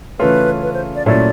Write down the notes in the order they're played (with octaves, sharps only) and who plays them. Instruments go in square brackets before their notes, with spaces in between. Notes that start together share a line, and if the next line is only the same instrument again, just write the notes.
[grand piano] C#3 E3 A3 C#4 F4 [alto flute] B4
[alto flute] B4
C5
D5
[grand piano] A#2 F#3 A3 C#4 E4 [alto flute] D5